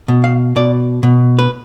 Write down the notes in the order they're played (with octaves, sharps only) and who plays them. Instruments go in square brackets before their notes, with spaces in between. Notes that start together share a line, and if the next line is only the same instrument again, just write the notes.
[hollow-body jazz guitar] B2
F5
B2 D5
B2
B4